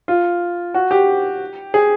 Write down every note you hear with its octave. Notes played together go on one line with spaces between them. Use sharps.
F4
F#4
G4
G#4